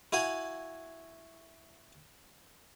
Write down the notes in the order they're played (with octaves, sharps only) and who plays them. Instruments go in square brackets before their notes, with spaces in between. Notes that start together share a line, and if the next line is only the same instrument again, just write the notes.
[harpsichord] E4 F#4 F5 G#5